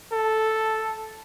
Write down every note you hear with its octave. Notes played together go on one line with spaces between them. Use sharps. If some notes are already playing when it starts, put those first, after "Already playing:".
A4